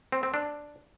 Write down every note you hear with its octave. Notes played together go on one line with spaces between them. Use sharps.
C4
C4
D4